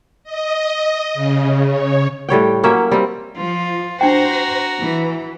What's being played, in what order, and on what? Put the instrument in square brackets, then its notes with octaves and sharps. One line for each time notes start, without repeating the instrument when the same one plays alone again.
[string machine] D#5
C#3
C#5
[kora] A2 G3 C#5 G5
F#3 A#3 C#4 E5
G3 C4
[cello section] F3 [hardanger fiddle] F4
[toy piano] D4 E4 G5 [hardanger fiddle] F#4 A#5 [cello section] C5
[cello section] E3